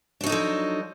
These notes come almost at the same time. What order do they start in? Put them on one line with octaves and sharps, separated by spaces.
D4 F#3 D#4 A4 F3